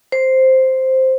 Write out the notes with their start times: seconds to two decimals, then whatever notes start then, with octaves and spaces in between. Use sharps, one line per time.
0.12 C5